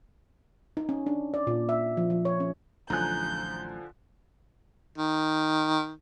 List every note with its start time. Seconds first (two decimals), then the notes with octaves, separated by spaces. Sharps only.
0.77 D#4
0.89 C#4
1.06 D4
1.34 D5
1.47 A#2
1.69 E5
1.97 F3
2.10 F3
2.25 C#5
2.40 C#4
2.90 A1 D3 F3 F#3 G#5 A#5 F#6 G6
4.98 D#3